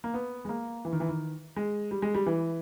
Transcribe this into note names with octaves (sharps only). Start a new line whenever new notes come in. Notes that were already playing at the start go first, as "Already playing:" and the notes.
A#3
B3
G#3
A#3
E3
D#3
E3
D#3
G#3
G3
G#3
G3
E3